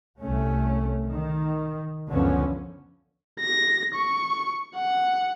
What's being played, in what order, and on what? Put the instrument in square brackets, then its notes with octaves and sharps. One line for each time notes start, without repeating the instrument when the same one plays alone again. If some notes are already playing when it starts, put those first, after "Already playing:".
[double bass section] C2 A3 C#4
D#3
C#2 F#2 D3 F3 B3 C#4
[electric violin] A#6
C#6
F#5